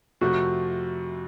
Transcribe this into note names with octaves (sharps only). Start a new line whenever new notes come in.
F2 C3 F3 A3 F#4